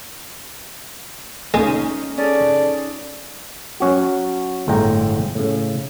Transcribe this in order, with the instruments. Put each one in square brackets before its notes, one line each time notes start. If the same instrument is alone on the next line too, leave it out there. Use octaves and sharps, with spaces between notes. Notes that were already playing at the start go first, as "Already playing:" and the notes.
[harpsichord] G#3 [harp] C#4 D#4 F4
[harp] C#4 [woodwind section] G#4 A4 D5
[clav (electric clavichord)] F#3 C#4 F#4
G1 A2 G#3 G5 A#5
A2 C#3